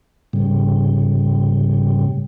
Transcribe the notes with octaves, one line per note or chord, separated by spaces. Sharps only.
G#2 C#3 G3